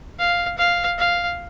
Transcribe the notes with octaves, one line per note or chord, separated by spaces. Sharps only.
F5
F5
F5